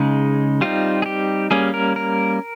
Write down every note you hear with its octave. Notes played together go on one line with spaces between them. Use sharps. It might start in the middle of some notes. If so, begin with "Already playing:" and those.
Already playing: C#3 G#3 D#4 G#4
G3 C4 D#4 F4
G#4
G4
G3 A#3 C#4 G#4
A#4
A#4